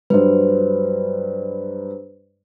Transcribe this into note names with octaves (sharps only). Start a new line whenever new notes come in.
G2 F#3 B4 C5